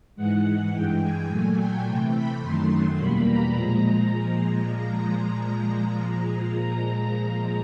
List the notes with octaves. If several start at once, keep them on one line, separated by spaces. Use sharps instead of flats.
G#2 E3 G#3 F#5
G2 E3 G#3 G5
G#5
A#2 F#3 A3
G5
C3 E3 A3
B5
F#2 D#3 F#3 A3 C6
E2 B2 G3 A#3 B5
A#5
A#2 F3 G#3